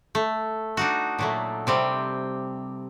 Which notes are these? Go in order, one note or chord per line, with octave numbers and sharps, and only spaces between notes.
A3
D4 D#4 F#4
A#2 F#3 A3
C3 G3 C4